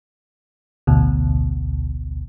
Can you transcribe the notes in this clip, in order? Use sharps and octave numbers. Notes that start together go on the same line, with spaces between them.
A1 D2 B2